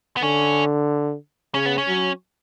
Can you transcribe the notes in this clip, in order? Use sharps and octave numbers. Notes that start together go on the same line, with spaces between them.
B3
D3 C#4
C#3 C#4
B3
C#4
F#3